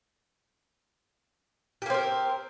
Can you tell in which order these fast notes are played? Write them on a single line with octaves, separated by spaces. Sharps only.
G4 A#3 C4 A#4